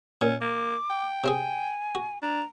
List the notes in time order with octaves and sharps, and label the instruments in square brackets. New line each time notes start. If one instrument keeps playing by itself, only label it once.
[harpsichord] A#2 [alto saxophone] C#4
[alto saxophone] A#3 [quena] D6
[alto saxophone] G5
[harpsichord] C3 C4 G#4 [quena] G#5
[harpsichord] F#4
[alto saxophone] D4 [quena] A#5